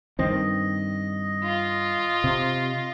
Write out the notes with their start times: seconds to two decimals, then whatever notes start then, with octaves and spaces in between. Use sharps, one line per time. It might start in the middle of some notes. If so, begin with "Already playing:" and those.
0.19 G2 D#3 C4 D#5
1.44 F4
2.24 C3